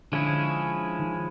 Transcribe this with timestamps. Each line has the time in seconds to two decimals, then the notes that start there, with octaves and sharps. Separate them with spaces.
0.12 D3 F3 G#3 C#4 E4 G#4
0.99 D#3